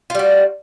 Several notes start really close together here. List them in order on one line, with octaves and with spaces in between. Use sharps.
F4 G3 F#4